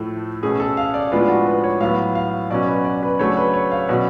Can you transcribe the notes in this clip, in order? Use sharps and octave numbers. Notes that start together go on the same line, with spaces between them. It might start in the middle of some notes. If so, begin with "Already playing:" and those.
Already playing: A2 F3 A3
B2 A3 C#4 G#4
A4
F5
D5
A2 F3 G#3 B3 D4 F4
F#4
B4
C#5
A2 F#3 B3 F5
F5
B2 F#3 C#4 D5
B4
D5
B4
C#3 F#3 A3 D4 C#5
B4
C#5
F5
B2 F#3 C#4 D5